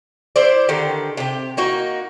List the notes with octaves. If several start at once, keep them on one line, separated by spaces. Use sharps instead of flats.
E4 C5 D5
D3 D#3 G4
C3 G4
A#3 D#4 F#4